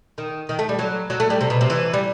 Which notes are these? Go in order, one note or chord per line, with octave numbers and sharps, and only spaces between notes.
D#3
D#3
A3
G3
F#3
F#3
A3
G3
C3
B2
C3
E3
G3